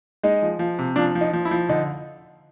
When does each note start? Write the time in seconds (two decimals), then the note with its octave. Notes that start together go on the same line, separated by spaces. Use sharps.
0.23 G#3 D#4
0.42 F3
0.59 F3
0.79 C3
0.96 F3 D4
1.15 F3
1.21 D#4
1.33 F3
1.45 E4
1.51 F3
1.69 D3 D#4